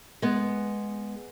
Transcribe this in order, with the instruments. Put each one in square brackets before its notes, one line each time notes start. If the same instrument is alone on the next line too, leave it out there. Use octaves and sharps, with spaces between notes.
[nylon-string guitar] G#3 B3